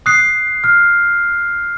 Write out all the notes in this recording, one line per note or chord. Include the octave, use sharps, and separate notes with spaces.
D#6 F#6 C7
F6